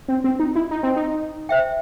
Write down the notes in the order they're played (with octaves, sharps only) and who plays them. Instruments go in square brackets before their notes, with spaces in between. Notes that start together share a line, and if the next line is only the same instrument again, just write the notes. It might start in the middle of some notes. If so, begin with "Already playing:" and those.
[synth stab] C4
C4
D#4
E4
D#4
C4
D#4
[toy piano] C5 E5 G5